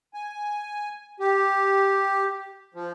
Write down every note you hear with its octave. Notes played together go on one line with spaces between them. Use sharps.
G#5
G4
F3